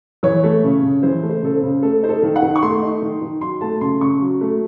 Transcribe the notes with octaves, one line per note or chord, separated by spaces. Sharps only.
E3 C#5
A3
C#3
C#3
E3 C5
A3
C5
C#3 A4
C5
C#3
A3 A4
D#4 C5
A4
D#3
F#5
D#3
C#6
A3 C6
D#4
D#3
D#3
F#3 C6
A3 A5
C#3 C6
C#3 C#6
F#3
A3